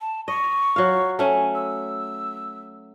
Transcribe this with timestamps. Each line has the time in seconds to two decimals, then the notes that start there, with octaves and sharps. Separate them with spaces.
0.01 A5
0.28 D#5 C#6
0.76 F#3 F5
1.19 A3 C#4 G#5
1.55 E6